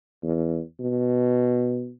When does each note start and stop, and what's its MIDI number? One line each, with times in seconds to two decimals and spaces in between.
0.23 0.60 40
0.80 1.92 47